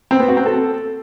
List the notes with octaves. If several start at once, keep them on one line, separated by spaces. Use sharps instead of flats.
C4
B3
F#4
C4
A4